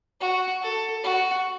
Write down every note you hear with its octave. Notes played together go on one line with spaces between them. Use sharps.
F#4
A4
F#4